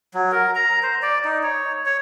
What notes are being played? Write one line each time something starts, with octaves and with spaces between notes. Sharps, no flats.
F#3
A#4
A#5
C5
D5
D#4
C#5
C#5